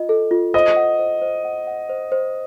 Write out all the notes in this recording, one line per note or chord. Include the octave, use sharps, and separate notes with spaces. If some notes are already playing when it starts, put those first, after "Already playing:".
Already playing: F4 D#5
A4
F4
C5 D#5
F#5
C5
C5
F#5
F#5
C5
C5